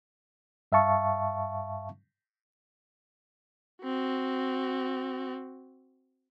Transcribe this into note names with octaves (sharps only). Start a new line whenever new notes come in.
G2 E5 F5 A5 C#6
C4 F#4